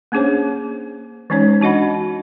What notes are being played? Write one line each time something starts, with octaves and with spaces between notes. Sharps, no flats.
A#3 C#4 D4 G#4 C5 C#5
E3 G#3 C#4 D#4 C#5
D4 F#4 D#5 F#5 B5